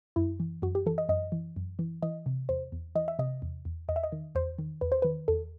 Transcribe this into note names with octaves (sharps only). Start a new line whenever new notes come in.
F#2 E4
E3
F#2 F#4
G4
E3 A4
D#5
F#2 D#5
E3
F#2
E3
E3 D#5
C3
E2 C5
E2
E3 D#5
E5
C3 D#5
E2
E2
E2 D#5
E5
D#5
D#3
E2 C5
D#3
E2 B4
C5
D#3 B4
E2 A4